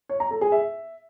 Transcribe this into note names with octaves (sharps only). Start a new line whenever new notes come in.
C#5
A#5
A4
G#4
E5